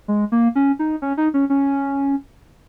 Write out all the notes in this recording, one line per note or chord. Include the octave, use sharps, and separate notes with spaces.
G#3
A#3
C#4
D#4
C#4
D#4
C#4
C#4